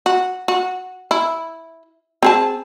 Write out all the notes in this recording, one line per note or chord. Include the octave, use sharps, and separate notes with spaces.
F#4
F#4
E4
C4 G#4 A5